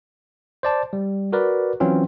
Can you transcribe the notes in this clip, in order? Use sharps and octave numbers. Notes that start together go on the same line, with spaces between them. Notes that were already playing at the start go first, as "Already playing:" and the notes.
C5 D5 A5
G3
F#4 A#4 B4 D5
E3 F#3 C4 C#4 F4